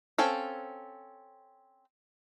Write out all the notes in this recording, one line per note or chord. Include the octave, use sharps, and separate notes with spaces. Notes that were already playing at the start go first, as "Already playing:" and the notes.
C4 C#4 A4 F5